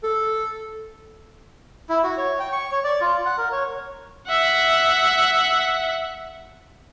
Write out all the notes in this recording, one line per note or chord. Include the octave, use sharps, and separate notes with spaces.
A4
E4
F#4
C#5
G5
C#6
C#5
D5
F4
F#5
A#4
C#5
E5 F#5